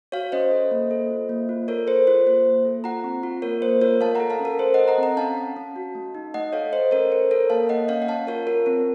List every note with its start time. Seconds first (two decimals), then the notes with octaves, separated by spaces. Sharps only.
0.12 F#4 C#5 F5
0.32 C#4 C5 D#5
0.51 A4
0.71 A#3
0.91 A4
1.10 F4
1.29 A#3
1.49 F4
1.68 A4 A#4 C#5
1.87 A4 C5
2.07 F4 C5
2.26 A#3 C5
2.45 A#3
2.65 A4
2.84 F4 F#5 A#5
3.04 C4
3.23 F4
3.42 A#3 A#4 C#5
3.62 A#3 C5
3.81 F4 A#4 C#5
4.00 A3 F5 A5
4.15 A4 F#5 A#5
4.30 F5 A5
4.40 C#4
4.45 A#4
4.59 A4 C5
4.74 A4 D#5 F#5
4.88 F#5 A#5
4.98 C4
5.03 F#5 A#5
5.17 C#4 F5 A5
5.37 C#4
5.56 C#4
5.76 F#4
5.95 A3
6.15 D#4
6.34 A3 D#5 F#5
6.53 A4 C#5 F5
6.73 A4 C5 D#5
6.91 C#4 A#4 C#5
7.11 A4 C5
7.31 A4 A#4 C#5
7.50 A#3 F5 A5
7.69 A#3 D#5 F#5
7.88 C#4 C#5 F5
8.02 F#5
8.08 C#4 F5 A5
8.27 F4 A#4 C#5
8.47 F4 A#4
8.66 C4 A#4